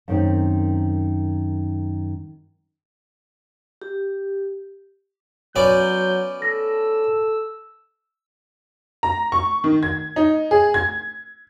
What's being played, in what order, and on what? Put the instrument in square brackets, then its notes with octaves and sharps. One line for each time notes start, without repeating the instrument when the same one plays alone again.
[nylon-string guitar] F#2 D#3 C4
[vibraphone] G4
[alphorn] F#3 [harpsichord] B3 C#4 D5 [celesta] C#5 [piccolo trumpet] G6
[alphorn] A4 [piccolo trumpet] E6 [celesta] A#6
[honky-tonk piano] A#5
C#6
D#3
G#6
D#4
G#4
G#6